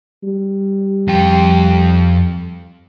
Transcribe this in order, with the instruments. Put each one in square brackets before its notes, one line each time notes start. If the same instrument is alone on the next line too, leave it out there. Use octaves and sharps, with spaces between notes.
[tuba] G3
[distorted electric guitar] F2 G5